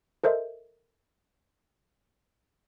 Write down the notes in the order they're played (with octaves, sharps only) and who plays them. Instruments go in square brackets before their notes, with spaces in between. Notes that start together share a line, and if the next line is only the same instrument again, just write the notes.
[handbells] A4 A#4 C5 D#5 E5